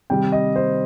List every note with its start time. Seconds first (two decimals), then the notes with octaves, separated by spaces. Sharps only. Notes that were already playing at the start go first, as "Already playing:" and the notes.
0.10 C3 D#3 G3 G5
0.32 D#5
0.56 C5